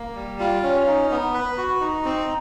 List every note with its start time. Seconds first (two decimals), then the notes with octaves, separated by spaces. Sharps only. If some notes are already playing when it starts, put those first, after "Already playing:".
Already playing: A#3
0.15 G3
0.40 F4
0.63 C#4
0.87 D#4
1.11 B3
1.34 B4
1.58 F#4
1.81 D#4
2.05 C4